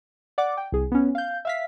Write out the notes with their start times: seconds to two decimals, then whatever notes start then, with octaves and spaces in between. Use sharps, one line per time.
0.38 D5 F#5 D6
0.57 G5
0.72 C2 G#4
0.92 B3 C#4
1.15 F5 G6
1.45 E5 F5 B6